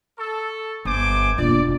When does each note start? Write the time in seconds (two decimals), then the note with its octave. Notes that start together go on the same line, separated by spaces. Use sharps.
0.18 A4 C#6
0.85 G1 C5 G#5 D6
1.38 E1 A#3 D4 F4 D5